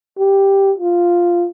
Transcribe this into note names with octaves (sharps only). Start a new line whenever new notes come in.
G4
F4